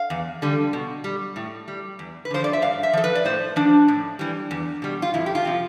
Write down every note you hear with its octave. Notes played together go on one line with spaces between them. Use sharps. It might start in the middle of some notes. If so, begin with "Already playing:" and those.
Already playing: F5
E2
D3 G3
B2
G3
A2
G3
E2
B4
D3 F3 C5
D5
E5
G2 F5
E5
F3 A4
B4
D5
A2 C5
F3 D4
A2
E3 G3
E2
B2 G3
F4
F2 E4
G4
F4
C3 F3